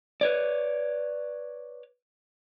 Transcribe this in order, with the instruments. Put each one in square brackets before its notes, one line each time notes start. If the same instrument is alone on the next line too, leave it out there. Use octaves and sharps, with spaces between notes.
[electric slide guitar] B4 C#5 D5